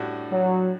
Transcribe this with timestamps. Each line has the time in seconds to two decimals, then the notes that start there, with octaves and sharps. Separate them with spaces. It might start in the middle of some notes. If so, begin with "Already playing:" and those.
Already playing: A2 G3 D4 F#4
0.31 F#3